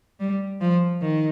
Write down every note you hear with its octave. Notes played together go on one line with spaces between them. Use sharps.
G3
F3
D#3